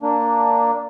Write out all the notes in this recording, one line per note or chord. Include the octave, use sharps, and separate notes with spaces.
A#3 D4